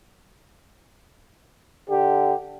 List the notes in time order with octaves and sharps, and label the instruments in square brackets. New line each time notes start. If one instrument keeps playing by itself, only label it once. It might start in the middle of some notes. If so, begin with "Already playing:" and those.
[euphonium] D3 [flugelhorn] G4